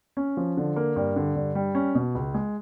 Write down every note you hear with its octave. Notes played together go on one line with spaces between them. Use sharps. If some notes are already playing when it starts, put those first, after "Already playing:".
C#4
F3
D3
A#3
G2
D3
G2
G3
C#4
B2
C#2
G#3